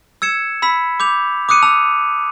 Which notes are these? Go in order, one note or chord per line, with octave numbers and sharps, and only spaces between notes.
E6 G#6 C#7 E7
B5 E6 B6
D6 G6 F7
D6 D#6 F#6 C#7 D#7
A5 E6 F7